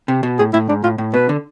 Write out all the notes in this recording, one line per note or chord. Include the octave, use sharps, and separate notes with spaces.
C3
B2
A2 G#4
A2 E4
G#2 D4
A2 F4
A2
B2 B4
D3